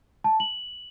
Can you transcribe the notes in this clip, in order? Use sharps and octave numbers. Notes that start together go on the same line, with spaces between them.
A5
F#7